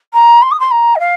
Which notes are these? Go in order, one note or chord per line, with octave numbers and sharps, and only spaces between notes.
A#5
C6
D#6
C6
A#5
D#5
F5